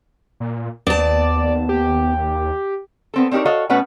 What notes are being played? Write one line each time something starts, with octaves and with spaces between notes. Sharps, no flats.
A#2
D#2 B3 D5 A5
G4
B3 C4 A4
C4 D4 D#4 G4 A#4 C#5
F#4 A4 C#5 D#5 F5
B2 A3 B3 C#4 B4 F#5